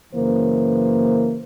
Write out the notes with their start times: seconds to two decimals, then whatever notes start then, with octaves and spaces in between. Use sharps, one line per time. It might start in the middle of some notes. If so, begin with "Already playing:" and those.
0.14 F#2 C#3 E3 A#3 C5